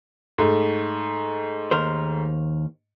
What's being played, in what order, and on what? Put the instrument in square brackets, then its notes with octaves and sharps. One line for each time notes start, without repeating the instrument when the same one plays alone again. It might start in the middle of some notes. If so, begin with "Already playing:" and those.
[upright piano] G#2 A3
[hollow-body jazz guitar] D#2 A#4 C5